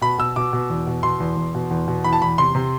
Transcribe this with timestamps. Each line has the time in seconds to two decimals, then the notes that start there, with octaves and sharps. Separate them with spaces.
0.01 B2 B5
0.18 B2 E6
0.36 B2 D6
0.53 B2
0.70 E2
0.87 B2
1.03 B2 C6
1.20 E2
1.37 E2
1.55 B2
1.71 E2
1.88 B2
2.04 E3 B5
2.13 A5
2.22 E2 B5
2.38 C3 C6
2.55 C3